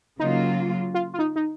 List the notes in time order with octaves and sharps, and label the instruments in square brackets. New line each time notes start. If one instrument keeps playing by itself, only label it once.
[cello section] C#3 F#3 A#3 F4 [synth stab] D#4
[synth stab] F4
F4
D#4
D#4